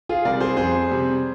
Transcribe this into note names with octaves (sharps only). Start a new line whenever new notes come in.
F4 G#4
C3 G3 A#4 D5
G#4 C5
F2 G#4 C5
C3 G3